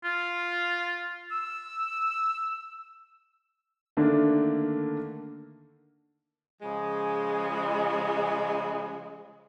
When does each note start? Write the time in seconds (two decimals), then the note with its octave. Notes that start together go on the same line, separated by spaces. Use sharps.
0.04 F4
1.31 E6
3.97 D3 D#3 A3 A#3 D4
6.62 C#3 F3 G#3